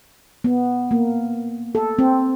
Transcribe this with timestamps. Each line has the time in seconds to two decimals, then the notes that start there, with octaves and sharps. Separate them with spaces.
0.44 B3
0.91 A#3
1.75 A4
1.99 C4